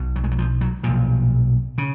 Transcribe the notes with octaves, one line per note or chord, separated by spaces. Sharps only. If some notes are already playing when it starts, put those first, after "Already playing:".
Already playing: B1 B2
F#3
G#3
F#3
F3
F#3
B1 A#2 F3
C#3